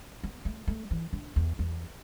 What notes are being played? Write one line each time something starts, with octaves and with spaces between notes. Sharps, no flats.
B3
A3
A3
E3
D3
E2
E2